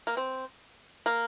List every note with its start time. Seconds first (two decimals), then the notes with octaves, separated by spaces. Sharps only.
0.07 A#3
0.17 C4
1.06 A#3